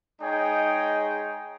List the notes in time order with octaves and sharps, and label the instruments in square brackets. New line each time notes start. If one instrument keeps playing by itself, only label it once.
[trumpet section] G#3 D#4 G#4 C#5 G5